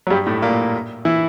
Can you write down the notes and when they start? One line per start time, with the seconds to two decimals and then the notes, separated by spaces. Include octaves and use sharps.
0.07 F#3
0.10 G2 G3
0.26 A2 A3
0.42 A#2 A#3
1.05 E3 E4